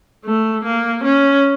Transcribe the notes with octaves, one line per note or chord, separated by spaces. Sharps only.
A3
A#3
C#4